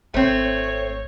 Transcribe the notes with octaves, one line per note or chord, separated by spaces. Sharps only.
G#1 A3 C4 C#5